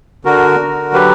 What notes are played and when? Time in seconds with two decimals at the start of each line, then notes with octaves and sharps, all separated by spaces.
0.25 D3 F#4 A#4
0.59 D3
0.93 F#3 G4 B4